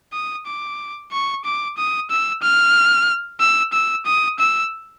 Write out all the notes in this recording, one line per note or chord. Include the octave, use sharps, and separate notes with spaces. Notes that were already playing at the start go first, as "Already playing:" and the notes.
D#6
D6
C#6
D6
D#6
E6
F6
E6
E6
D#6
E6